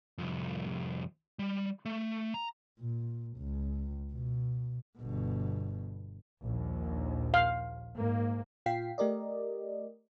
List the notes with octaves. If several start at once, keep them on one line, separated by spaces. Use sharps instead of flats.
C2 F2
G3
A3
A#5
A#2
C#2
B2
G1 B2
A#1 D#2
F5
G#2 A#3
A#2 F4 F5 G5 B6 C7
A3 G4 A#4 D5 D#5